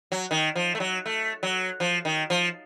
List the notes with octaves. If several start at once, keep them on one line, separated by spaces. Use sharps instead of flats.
F#3
D#3
F3
A3
F#3
A3
F#3
F3
D#3
F3